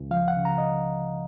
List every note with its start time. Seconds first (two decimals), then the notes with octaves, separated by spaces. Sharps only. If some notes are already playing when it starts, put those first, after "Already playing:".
Already playing: C#2
0.11 F3 F5
0.28 F#5
0.37 C#3
0.45 A#5
0.58 D#5